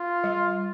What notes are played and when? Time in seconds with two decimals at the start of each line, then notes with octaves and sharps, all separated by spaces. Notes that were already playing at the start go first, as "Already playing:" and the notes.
Already playing: F4
0.24 G3